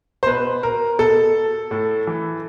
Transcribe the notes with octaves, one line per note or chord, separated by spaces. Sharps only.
C5
B2 B4
A#4
B2 A4
A2
E3